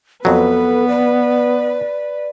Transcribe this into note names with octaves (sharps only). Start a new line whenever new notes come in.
F2 F#3 B3 A4 B4
D5